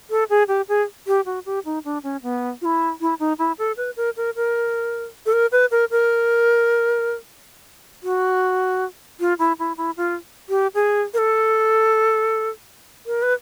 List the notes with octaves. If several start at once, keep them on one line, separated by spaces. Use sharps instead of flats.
A4
G#4
G4
G#4
G4
F#4
G4
D#4
D4
C#4
B3
F4
E4
E4
D#4
E4
A4
B4
A#4
A#4
A#4
A4
A#4
B4
A#4
A#4
F#4
F4
E4
E4
E4
F4
G4
G#4
A#4
A4
A#4
B4